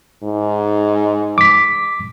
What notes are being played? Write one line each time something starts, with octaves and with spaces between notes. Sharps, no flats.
G#2
D6 B6